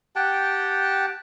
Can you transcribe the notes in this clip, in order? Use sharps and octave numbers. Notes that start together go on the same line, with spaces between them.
G4 F#5 G5 A5